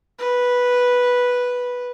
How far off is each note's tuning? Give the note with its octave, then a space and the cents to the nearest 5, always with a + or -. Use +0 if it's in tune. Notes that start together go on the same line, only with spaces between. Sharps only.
B4 -5